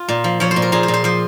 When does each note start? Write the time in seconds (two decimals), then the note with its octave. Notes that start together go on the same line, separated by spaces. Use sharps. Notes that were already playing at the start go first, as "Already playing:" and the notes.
Already playing: F4
0.09 A#2
0.24 F3
0.40 F3 C#5
0.51 C5
0.56 A#2
0.62 A#4
0.72 A#2 G#4
0.83 C5
0.88 A#2
0.94 C5
1.04 F3 C5